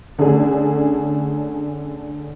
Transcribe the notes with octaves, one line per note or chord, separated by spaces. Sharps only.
D3 A3 C#4 D4 G#4